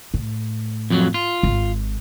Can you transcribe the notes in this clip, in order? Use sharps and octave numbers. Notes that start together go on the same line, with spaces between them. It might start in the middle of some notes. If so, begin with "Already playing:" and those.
A2
F2 F#3
F4
G#1